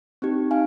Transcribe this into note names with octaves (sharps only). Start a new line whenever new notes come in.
C4 D#4 G4
D#4 F5 G#5